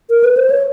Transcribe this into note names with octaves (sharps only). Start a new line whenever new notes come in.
A#4
B4
C5
C#5